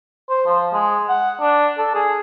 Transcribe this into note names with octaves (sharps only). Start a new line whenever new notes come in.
C5
F3
G#3
F#5
D4
A4
G#4